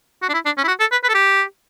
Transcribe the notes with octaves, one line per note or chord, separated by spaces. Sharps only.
F#4
D4
E4
D4
C#4
E4
F#4
A4
B4
B4
A4
G4